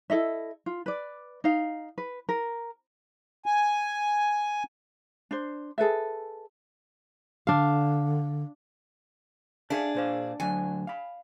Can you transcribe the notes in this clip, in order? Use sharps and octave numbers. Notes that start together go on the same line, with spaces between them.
E4 A4 D#5 E5
F4
B4 D5
D#4 F5
B4
A#4
G#5
D4 C5
G#4 A4 B4 E5
D3 D4 F5
D4 G#4 E5 F5 A5
A#2 C5 F5
D2 F#3 D4 G#5
F5 B5